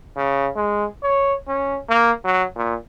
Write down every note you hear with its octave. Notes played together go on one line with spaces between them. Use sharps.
C#3
G#3
C#5
C#4
A#3
F#3
A#2